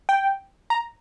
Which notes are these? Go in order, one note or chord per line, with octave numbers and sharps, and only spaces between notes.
G5
A#5